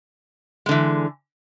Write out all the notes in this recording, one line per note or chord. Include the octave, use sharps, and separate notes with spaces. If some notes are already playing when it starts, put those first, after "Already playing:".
D3 E3 G#3